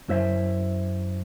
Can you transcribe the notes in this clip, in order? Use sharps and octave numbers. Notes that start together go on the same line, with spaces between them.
F#2 E4 C5 E5